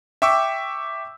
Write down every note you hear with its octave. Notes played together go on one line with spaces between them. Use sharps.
E5 G5 C#6 D6 E6